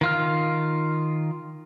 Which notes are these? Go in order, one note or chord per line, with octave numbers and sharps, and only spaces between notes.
D#3 F4 F6